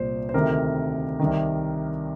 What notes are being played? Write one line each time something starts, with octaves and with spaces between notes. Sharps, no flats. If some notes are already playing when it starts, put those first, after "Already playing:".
Already playing: C2 A#2 C5
C5
D2 C3 D#3 A#4
C2 C3 D#3